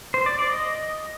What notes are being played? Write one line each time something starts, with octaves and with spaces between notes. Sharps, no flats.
C5
D5
D5
D#5